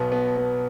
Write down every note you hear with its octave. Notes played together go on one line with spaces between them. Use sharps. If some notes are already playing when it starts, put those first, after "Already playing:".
Already playing: B1 B2 B3
B3
B3